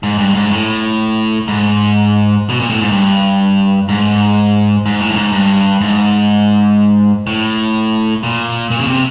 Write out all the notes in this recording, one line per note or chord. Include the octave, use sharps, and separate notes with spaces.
G#2
G2
G#2
A2
G#2
B2
A#2
A2
G#2
G2
G#2
G#2
A2
G2
G#2
G2
G#2
A2
A#2
A#2
C#3
C3